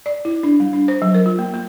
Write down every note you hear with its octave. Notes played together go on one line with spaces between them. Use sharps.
D5
E4
D4
G3
D4
C5
F#3
A#4
F4
A#3
A#3